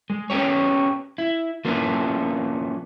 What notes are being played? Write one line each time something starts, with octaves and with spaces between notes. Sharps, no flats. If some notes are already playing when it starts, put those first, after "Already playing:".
G#3
B3 C#4 E4 G4 C#5
E4
F3 A#3 B3 C#4 D4 E4